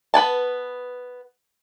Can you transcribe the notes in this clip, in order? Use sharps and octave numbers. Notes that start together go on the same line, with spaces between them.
B3 B4 G#5 A5